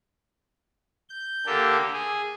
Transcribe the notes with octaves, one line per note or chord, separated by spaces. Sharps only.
G6
D3 A#3 G4 A4
G#4